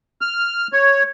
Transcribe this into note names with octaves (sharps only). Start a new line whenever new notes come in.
F6
C#5